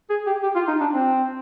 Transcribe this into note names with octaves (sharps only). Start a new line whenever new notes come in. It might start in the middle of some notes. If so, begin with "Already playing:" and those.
G#4
G4
G4
F4
D#4
D4
C4